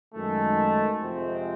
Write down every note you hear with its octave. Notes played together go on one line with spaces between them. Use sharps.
F#2 D#3 G#3 A3
F2 C3 F3 G#3 C4